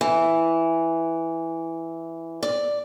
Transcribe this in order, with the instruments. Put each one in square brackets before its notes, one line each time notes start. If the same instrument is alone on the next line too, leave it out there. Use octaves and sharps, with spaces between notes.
[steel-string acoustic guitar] E3
D5